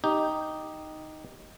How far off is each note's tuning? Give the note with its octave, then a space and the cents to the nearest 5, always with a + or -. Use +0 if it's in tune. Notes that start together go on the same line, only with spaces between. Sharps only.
D#4 +0 G4 +0